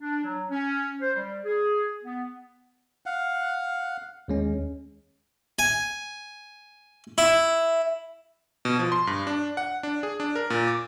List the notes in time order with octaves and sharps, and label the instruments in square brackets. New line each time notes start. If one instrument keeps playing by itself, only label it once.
[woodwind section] D4
F#3
C#4
C5
G3
G#4
B3
[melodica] F5 F#5
[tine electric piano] D#2 G#3 C#4
[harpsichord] G#5
E4
[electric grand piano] B2
F3
C6
G2
D4
F#5
D4
G#4
D4
A#4
A#2
D6